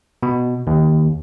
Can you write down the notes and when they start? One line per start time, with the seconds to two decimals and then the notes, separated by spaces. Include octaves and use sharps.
0.23 B2
0.67 D#2